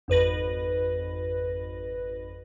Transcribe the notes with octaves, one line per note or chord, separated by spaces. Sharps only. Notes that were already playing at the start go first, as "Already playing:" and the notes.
G#1 F2 B4 A#6